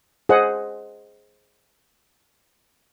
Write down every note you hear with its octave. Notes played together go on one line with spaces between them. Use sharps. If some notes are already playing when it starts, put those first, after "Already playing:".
G#4 C5 D#5 F#5